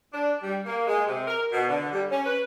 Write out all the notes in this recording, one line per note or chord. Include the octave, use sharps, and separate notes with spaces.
D4
G3
A#3
G#3
C3
A#4
B2
D3
G3
C#4
B4